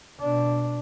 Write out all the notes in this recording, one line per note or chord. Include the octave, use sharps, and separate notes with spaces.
B2 D4